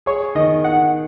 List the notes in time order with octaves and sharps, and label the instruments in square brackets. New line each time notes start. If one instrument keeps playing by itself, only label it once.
[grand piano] G#4 [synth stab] C#5
[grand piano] D#3 [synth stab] D#5
[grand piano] D#4 [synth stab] F#5